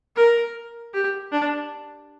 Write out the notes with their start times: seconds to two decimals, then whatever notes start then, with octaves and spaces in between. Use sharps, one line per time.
0.16 A#4
0.94 G4
1.32 D4